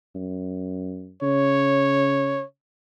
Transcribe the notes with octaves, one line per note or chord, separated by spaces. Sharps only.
F#2
C#3 C#5